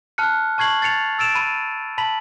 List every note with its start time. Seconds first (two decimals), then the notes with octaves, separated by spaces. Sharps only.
0.18 A5 F6 F#6 C#7
0.58 A5 C#6 G#6 C7 F#7
0.82 A6 C7 C#7 F7
1.19 E6 A6 D7 E7 F7
1.35 B5 D#7
1.98 A5 B5 B6 F#7